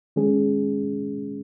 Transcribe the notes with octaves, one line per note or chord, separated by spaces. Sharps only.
D#3 G#3 C#4 G#4